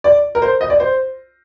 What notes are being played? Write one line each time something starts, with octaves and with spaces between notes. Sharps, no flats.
D5
A#4
C5
D#5
D5
C5